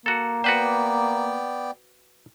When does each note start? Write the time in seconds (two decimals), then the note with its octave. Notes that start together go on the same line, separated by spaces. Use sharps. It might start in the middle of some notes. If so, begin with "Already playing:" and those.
0.06 A#3 F#4 A4
0.44 B3 F#4 B4 C5 D5 G5